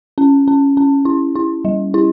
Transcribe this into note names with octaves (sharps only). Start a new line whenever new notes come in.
C#4
C#4
C#4
E4
E4
G3
E4